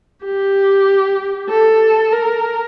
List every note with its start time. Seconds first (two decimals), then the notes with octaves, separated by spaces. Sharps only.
0.24 G4
1.49 A4
2.13 A#4